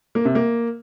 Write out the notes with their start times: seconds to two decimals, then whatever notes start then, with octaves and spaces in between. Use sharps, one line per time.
0.15 A#3
0.25 C3
0.35 A#3